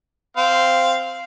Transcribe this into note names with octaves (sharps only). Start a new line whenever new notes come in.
C4 F5